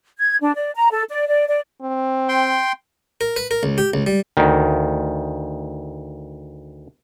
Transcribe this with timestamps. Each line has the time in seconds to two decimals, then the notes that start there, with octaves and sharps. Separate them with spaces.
0.19 G#6
0.41 D4
0.55 D5
0.75 A#5
0.92 A4
1.09 D5
1.28 D5
1.48 D5
1.82 C4
2.29 G5 C6
3.21 A#4
3.36 B4
3.51 A#4
3.63 C#2
3.78 G4
3.94 C#2
4.07 G3
4.37 D2 D#3